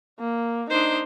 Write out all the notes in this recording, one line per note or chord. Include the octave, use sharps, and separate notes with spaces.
A#3
D4 D#4 C5